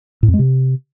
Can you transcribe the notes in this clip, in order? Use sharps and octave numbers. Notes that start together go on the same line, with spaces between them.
A2
F2
G#3
C3